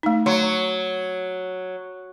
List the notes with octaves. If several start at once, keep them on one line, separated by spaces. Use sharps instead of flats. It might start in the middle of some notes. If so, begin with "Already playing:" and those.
A3 D#4
F#3 C6